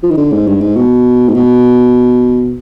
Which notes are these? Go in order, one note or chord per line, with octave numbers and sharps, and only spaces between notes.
F3
D#3
D3
G#2
G2
G#2
B2
G#2
B2